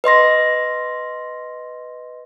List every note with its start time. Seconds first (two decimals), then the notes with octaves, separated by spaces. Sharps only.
0.04 B4 D#5 C6 A#6